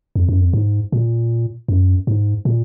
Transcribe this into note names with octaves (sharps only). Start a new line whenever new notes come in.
F2
F#2
F2
G#2
A#2
F#2
G#2
A#2